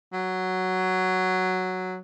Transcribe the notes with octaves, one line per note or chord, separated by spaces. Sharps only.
F#3